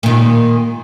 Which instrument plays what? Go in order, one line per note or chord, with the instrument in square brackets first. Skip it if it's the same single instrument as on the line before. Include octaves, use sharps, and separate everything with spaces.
[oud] A#2 D#3